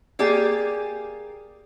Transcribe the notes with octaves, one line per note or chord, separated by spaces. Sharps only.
A#3 G4 G#4 D5